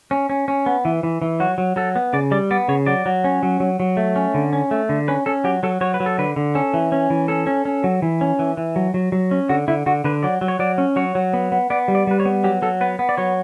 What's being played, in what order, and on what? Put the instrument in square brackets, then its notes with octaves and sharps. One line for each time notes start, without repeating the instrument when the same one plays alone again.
[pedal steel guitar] C#4
C#4
C#4
B3
E3
E3
E3
F#3 F#4
F#3
F#3 A4
B3
C#3 D5
G3 D5
B3 D5
C#3 C#5
F#3 D5
F#3
C#4
F#3
F#3
F#3
A3
C#4
D3
C#4
A3
D3
C#4 B4
C#4 A4
F#3 G4
F#3 A4
F#3 C#5
B4
F#3
A4
D3 B4
D3
C#4 A4
E3
C#4
E3
C#4 A4
C#4
C#4
F#3
E3
C#4
E3
E3
F#3
F#3
F#3
C#4
D3 F#4
D3 E4
D3 F#4
D3 B4
F#3 D5
F#3
C#5
F#3 D5
C#4
F#3 C#5
F#3
B3
B3
B3 D5
G3
D5
G3 B4
C#5
B3
F#3 G4
F#3 A4
B3 B4
B3
D5
F#3 C#5